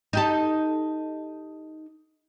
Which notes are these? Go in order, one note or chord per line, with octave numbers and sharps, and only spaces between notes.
D#4 G4 A4